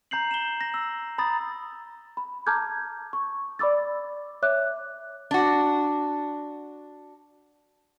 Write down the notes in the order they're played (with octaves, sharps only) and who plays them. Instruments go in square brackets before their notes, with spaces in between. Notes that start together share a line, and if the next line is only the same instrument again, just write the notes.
[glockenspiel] A#5 G6 C7 F#7
E7 G7
A#6
E6
A#5 B5 D#6 A6
[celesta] B5
A5 A#5 D6 F6 G6 G#6
C#6
D5 B5 D6 E6 A6
C#5 E5 D6 F#6
[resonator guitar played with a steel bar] D4 F#4